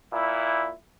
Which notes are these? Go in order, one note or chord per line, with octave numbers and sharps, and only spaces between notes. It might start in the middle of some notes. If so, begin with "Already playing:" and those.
A#2 E4